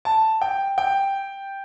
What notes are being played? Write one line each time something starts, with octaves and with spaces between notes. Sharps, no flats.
A5
G5
G5